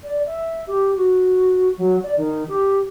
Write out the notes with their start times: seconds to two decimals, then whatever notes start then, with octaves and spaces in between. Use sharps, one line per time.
0.04 D5
0.26 E5
0.67 G4
0.96 F#4
1.78 F#3
2.03 D5
2.17 D#3
2.48 G4